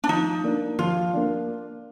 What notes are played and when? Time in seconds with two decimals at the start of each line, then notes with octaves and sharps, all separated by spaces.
0.04 D4
0.09 F3 D#4
0.44 A#3 D4
0.79 F3 F4
1.14 A#3 D4